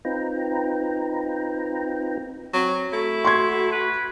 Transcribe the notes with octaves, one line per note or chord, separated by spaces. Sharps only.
C4 D#4 F4 B4 G5 A#5
F#3 C4
A3 E4 F#4
C6 C#6 G#6
B4